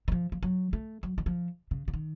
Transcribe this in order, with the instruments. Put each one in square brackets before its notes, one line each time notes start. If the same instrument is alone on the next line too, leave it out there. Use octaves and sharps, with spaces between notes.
[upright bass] D#3
F3
F3
F#3
A3
F#3
D#3
F3
C#3
C#3
D#3